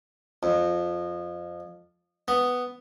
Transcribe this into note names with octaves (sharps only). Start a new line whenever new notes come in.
F2
B3